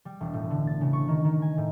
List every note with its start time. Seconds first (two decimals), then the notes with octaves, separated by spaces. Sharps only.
0.05 G3
0.21 E1
0.34 A2
0.50 D3
0.67 A6
0.81 C#3
0.93 C#6
1.08 D#3
1.24 D#3
1.42 G#5
1.57 A2